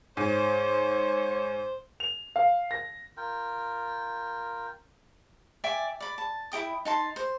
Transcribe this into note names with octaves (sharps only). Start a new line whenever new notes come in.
G#2 C5 C#5
F7
F5
A#6
F4 A#4 G5
D5 E5 G5 G#5
D5 B5
A5
E4 A#4 G5 D#6
D#4 A5 C6
C5